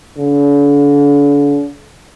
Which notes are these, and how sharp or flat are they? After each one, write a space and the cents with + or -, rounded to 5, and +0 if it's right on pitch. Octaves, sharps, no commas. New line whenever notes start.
D3 -45